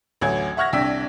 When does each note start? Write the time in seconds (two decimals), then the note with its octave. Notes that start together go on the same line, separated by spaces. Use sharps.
0.21 A1 D2 F#3 G#5 G#6
0.57 E5 F#5 C#6 F6 G#6 A#6
0.73 C2 D4 G5 E6 B6